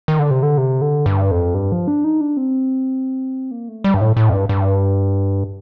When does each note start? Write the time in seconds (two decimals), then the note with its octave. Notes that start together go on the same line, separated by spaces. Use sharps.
0.08 D#3
0.19 D3
0.31 C3
0.43 D3
0.57 C3
0.81 D3
1.06 G2
1.31 F2
1.54 G2
1.72 F3
1.88 D4
2.04 D#4
2.21 D4
2.37 C4
3.51 A#3
3.68 A3
3.84 G3
3.94 G2
4.01 A2
4.17 A2
4.29 F2
4.33 G2
4.49 G2